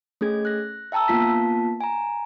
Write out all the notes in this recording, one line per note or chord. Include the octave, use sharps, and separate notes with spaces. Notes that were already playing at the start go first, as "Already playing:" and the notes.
A3 C#4 G#4 G#6
F#6 A#6
E5 G5 A5 A#5 E6
A#3 B3 F4 A5 B6
G#5 A#5